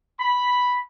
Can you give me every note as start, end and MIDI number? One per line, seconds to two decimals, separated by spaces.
0.20 0.82 83